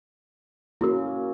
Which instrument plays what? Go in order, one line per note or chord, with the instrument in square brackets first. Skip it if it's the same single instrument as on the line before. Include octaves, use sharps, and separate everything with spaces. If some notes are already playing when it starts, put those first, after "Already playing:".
[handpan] A#3 C#4 [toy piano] E4 F#4 A#4